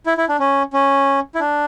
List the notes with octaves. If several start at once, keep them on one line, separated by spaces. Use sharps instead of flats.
E4
E4
D4
C#4
C#4
E4
D4